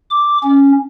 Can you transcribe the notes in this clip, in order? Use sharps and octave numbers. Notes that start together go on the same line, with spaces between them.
D6
C#4